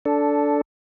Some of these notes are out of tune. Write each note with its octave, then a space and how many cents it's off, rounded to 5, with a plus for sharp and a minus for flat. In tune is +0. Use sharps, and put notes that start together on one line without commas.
D4 -15 A4 +0